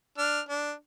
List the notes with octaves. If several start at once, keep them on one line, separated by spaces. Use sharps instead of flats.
D4 F6
D4